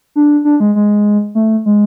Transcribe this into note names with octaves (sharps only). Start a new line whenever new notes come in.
D4
D4
G#3
G#3
A3
G#3